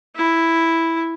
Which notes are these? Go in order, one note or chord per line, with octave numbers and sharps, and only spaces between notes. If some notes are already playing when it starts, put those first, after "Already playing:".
E4